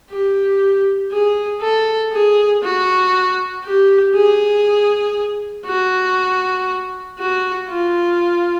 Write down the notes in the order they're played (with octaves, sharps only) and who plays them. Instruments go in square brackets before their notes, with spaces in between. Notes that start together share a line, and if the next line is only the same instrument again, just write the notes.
[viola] G4
G#4
A4
G#4
F#4
G4
G#4
F#4
F#4
F4